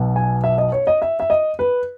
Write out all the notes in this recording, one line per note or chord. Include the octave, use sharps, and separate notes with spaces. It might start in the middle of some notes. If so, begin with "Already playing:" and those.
Already playing: B1 B2
G#5
E5
D#5
C#5
D#5
E5
E5
D#5
B4